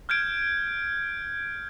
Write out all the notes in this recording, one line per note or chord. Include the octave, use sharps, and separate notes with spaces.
F6 G6 G#6 D7